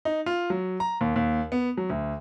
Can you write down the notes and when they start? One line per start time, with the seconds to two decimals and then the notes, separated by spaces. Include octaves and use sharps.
0.05 D#4
0.26 F4
0.50 F#3
0.80 A#5
1.01 D#2
1.16 D#2
1.52 B3
1.77 F#3
1.90 D2